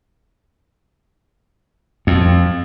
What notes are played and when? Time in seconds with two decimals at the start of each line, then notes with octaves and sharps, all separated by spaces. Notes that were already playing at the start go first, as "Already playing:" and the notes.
2.07 F2